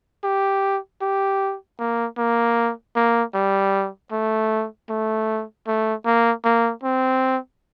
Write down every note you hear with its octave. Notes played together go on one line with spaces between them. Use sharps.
G4
G4
A#3
A#3
A#3
G3
A3
A3
A3
A#3
A#3
C4